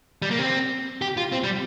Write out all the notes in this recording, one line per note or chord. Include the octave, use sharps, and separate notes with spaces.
G3
A#3
C4
G4
F4
C4
G3